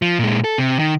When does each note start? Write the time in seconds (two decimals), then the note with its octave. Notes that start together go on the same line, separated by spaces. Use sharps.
0.02 F3
0.19 A#2 G#3
0.44 A4
0.58 C3
0.79 D#3